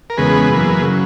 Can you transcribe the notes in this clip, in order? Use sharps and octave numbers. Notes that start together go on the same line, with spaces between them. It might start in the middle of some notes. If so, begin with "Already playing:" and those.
A#4
E2 C#3 G#3 B3 G#4 B4
F#2 E3 A#3
C#3 F#3